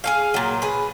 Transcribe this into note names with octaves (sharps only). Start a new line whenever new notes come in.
G#4 A4 F5
A#2 F#3
G#4 B4